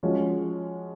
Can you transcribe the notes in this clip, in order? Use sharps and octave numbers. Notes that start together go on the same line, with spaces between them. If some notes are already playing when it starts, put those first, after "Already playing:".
F3 G#3 C#4 F#4